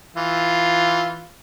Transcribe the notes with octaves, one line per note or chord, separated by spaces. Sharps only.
E3 F4